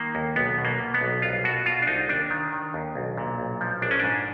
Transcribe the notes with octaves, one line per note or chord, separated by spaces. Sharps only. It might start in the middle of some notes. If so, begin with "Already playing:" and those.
Already playing: D#3 A#3
D#2
B1 B3
B2
A#3
B2
B3
B1
C2 F4
B2 F#4
B2 F4
D4
C2 D#4
D#2 D4
D#3
D#3
D#2
B1
A#2
B1
F3
A#1 D4
C#4
G#2 D4